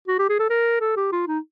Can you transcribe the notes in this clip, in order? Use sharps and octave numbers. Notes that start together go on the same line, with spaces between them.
F#4
G4
G#4
A4
A#4
A4
G4
F4
D#4